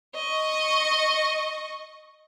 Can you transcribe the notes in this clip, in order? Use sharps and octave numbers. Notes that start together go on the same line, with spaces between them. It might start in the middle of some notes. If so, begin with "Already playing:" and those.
D#5 C#6